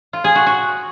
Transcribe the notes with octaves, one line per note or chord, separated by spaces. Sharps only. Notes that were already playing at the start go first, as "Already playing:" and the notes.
F4
G#4
F#4
F#4